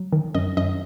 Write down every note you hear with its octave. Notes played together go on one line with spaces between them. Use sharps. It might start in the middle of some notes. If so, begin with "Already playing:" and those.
Already playing: F#3
D#3
F#2 D#5
F#2 D#5